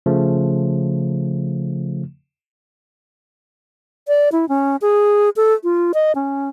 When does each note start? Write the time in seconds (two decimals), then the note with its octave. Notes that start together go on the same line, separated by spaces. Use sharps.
0.06 C#3 F3 A3
4.08 D5
4.32 E4
4.49 C#4
4.82 G#4
5.36 A4
5.64 F4
5.94 D#5
6.15 C#4